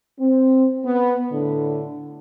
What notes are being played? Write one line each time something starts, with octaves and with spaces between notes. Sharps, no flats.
C4
B3
A2 D3